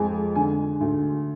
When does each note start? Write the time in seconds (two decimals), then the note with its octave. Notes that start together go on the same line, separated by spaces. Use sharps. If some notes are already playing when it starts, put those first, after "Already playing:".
Already playing: F2 G#3 G#5
0.35 D3 G#5
0.81 D2